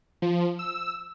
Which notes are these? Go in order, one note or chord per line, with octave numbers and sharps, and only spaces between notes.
F3
E6